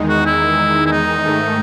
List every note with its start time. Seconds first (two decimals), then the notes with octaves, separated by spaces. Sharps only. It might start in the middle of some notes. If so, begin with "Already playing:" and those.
Already playing: E2 D#3 G#3 D#4
0.09 F#4
0.26 E4
0.86 E4
0.92 D#4
1.25 G#2 D#3 A3